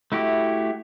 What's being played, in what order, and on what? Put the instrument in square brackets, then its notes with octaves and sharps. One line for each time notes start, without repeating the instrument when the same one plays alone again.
[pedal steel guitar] A3 E4 F#4 G4